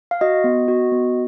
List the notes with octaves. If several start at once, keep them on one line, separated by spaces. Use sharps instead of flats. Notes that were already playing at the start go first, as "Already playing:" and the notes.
F5
F#4 D#5
B3
F#4
B3